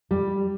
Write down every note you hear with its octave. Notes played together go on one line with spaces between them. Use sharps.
G3